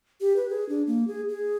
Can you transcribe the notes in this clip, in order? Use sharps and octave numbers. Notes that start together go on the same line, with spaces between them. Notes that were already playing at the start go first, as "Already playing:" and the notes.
G4
B4
G#4
D4
A#3
G#4
G#4